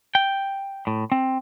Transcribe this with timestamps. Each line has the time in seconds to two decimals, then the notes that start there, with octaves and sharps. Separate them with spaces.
0.15 G5
0.87 A2
1.12 C4